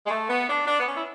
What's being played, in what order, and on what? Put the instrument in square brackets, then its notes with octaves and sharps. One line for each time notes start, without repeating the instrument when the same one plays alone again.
[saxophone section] G#3
A3
B3
D4
D4
B3
C#4
E4